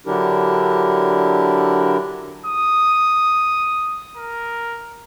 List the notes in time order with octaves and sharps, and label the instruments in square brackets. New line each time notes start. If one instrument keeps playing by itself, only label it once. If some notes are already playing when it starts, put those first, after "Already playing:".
[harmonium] D3 F#3 D4 E4 G4 A#4
[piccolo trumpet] D#6
A#4